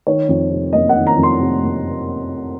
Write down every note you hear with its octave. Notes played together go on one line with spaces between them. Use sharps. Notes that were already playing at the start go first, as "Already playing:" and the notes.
D#3 C#5
F2
C3
F#1 D#5
F#5
D#3
A#5
F2
C6
C3
F#1